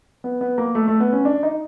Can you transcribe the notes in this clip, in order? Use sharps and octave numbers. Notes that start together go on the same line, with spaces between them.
B3
B3
A#3
A3
A3
B3
C#4
D4
D#4